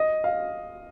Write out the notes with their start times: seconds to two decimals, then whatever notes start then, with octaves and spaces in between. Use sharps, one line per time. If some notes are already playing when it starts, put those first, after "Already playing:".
Already playing: D#5
0.24 F5